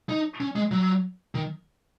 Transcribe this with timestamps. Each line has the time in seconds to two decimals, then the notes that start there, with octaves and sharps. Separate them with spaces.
0.09 D#4
0.40 C#4
0.56 G#3
0.71 F#3
1.35 D#3